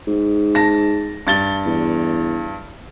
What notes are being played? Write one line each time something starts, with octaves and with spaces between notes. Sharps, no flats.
G#2
A5 A#6
G2 A6 G7
E2